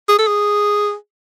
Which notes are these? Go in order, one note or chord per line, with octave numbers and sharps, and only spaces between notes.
G#4
A4
G#4